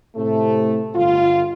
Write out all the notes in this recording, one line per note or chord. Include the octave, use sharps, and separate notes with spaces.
A2 C3 A3
G1 F4